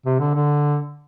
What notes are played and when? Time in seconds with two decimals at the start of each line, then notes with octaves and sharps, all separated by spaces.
0.06 C3
0.20 D3
0.35 D3